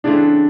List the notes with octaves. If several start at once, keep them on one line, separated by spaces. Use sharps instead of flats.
C#3 E3 A3 C4 D4